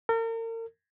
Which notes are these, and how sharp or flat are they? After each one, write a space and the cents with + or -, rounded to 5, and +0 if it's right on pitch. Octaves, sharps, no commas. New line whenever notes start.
A#4 -40